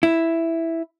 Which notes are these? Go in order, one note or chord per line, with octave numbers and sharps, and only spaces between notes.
E4